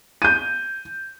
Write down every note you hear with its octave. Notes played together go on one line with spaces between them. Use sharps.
G6 D#7